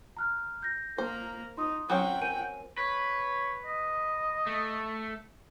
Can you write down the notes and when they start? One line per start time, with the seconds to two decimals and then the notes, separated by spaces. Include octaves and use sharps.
0.17 A#5 F6 F#6
0.63 G6 A#6
0.98 A#3 C5 A#5
1.57 D#4 C6 D#6
1.90 F#3 C4 C#4 F#5 G5
2.21 A#4 G#5 D#7
2.78 B4 C#5
3.65 D#5
4.47 A3